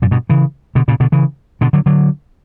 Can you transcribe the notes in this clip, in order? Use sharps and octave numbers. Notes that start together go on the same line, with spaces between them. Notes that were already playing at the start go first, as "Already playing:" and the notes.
F#2 A#2
G2 B2
C#3 E3
B2 D3
A#2 C#3
B2 D3
C#3 E3
B2 D3
D3 F#3
D3 F#3